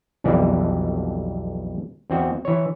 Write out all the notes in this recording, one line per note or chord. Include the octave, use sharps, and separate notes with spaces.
B1 F2 B2 E3 G3 D5
E2 C4 F#4
E3 C#5